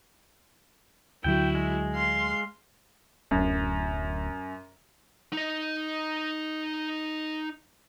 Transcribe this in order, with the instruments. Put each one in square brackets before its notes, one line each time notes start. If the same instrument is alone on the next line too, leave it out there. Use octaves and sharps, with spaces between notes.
[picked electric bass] D2 D3 F#3 [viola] E4 F#4 [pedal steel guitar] G5
[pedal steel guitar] G#3
[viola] F5 C6
[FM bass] D1 [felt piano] F#2
[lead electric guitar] D#4 D#5